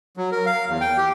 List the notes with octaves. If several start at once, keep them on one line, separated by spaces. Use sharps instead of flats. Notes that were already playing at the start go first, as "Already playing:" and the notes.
F#3
A#4
F5
E2
G5
G4